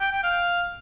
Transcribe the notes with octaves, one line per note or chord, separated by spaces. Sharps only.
G5
G5
F5